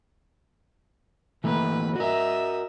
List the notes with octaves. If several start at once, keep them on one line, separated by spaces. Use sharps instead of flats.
E3 A3 A#3 B4
F#4 A#4 D#5 E5